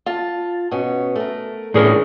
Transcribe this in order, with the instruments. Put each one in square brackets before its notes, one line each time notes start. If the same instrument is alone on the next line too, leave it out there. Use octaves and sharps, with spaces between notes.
[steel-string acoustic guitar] F4 A5
B2 C#4
A3 A#4
[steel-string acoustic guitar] F2 C#4 D4 [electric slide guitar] A2 G#4 A#4